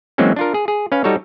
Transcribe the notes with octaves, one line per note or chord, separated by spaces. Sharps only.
E3 F#3 G#3 A#3 C4 C#4
D4 F4 A#4
G#4
G#4
C#4 B4 F5
G3 D#4 F#4 A4 C#5